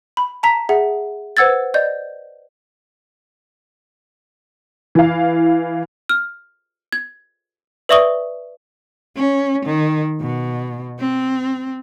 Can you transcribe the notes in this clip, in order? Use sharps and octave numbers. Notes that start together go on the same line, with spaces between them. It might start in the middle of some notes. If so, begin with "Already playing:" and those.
B5
A5 A#5 B6
G#4 E5 F#5
B4 C5 F#5 E6 G#6 A6
D5 D#5 G6
E3 F5
F6
G#6
B4 D5 E5 C#6 D#6 G7
C#4
D#3
B2
C4